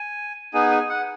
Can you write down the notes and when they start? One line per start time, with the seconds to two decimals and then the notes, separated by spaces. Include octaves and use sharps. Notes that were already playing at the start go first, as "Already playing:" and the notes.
Already playing: G#5
0.54 B3 D#4 G#4 G#5
0.71 G#5
0.89 F#5